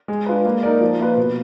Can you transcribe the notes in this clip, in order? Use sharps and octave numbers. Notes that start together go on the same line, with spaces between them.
G#3
D4 F4 B4
A#3
D#4 A#4 D5
F3
A#3 F4 B4
B2